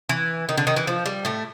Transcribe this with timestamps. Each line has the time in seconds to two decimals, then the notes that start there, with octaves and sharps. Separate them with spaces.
0.09 E3
0.49 D#3
0.58 D3
0.67 D#3
0.76 E3
0.87 F3
1.06 G3
1.25 A2 A3